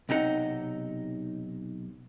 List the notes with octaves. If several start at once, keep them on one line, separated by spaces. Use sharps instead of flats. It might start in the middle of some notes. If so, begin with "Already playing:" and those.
B1 C3 D#4 G#4 F#5